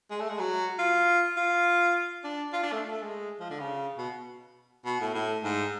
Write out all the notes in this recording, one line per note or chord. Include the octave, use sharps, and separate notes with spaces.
G#3
A3
G#3
F#3
F4
F4
D4
F4
D4
A3
A3
G#3
F3
D3
C#3
B2
B2
A2
A2
G#2